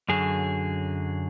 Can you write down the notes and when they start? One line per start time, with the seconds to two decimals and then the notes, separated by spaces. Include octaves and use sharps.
0.08 F#2 D3 F#3 G#4